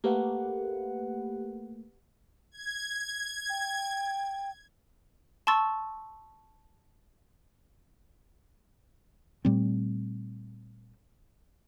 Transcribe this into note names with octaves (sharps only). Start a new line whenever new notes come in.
A3 A#3 G4 B4 F#5
G#6
G5
A5 C6 C#6 E6 A6
A#2 G3 A3 C4